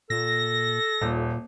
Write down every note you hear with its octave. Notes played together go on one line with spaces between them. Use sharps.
A#2 A4 A#6
D#1 A#2